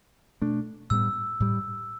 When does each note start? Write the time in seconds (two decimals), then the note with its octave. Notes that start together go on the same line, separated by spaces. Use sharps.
0.41 B2 A3 D4
0.90 A2 G3 B3 E6
1.40 A2 G3